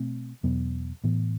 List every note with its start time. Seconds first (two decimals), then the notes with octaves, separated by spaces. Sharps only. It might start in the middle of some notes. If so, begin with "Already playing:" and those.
Already playing: B2 A3 C4
0.43 E2 B2 F#3 B3
1.04 A2 E3 B3